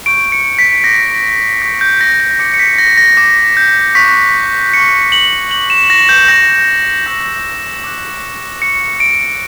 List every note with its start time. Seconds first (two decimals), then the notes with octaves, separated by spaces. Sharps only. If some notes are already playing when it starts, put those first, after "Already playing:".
0.06 C#6 G6 D7
0.32 C#7
0.59 B6
0.84 D6 G6 A#6
1.62 C#6 G6 B6
1.81 G6
2.01 A#6
2.20 A#6
2.39 D6 G6 C#7
2.54 C#7
2.59 B6
2.78 A#6
2.97 A#6
3.17 D6 G6 A#6
3.57 G6
3.95 C#6 F#6 B6
4.73 C#6 G6 C#7
5.12 F#7
5.51 D6 G6 F#7
5.70 E7
5.90 A#6
6.09 G6
6.28 C#6 G6 A#6
7.06 C#6 E6 G6 A#6
7.84 D6 F#6
8.62 C#6 F#6 C#7
9.00 D7